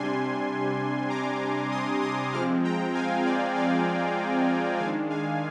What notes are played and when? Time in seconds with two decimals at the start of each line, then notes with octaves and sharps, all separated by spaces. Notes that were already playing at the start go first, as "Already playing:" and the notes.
Already playing: C3 G3 D4 G#5 C6
1.10 A#5 D6
1.71 C6 D#6
2.02 C6 D#6
2.32 F3 G#3 C4 D6 F6
2.64 G5 A#5
2.94 F5 G#5
3.26 D5 F5
3.56 D5 F5
4.79 D#3 G#3 D4 F5 G#5
5.10 F5 G#5